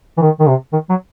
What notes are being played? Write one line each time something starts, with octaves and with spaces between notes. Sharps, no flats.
E3
D#3
D#3
C3
D#3
F#3